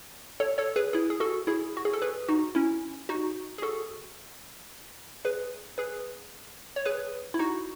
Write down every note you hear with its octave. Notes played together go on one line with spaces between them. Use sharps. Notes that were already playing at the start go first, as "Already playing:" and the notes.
A4 C#5
A4 C#5
G#4 B4
E4 G#4
G#4
F#4 A4
E4 G#4
F#4
G#4
A4
G#4 B4
D#4 F#4
C#4 E4
D#4 F#4
G#4
F#4 A4
G#4 B4
G#4 B4
C#5
G#4 B4
E4
D#4 F#4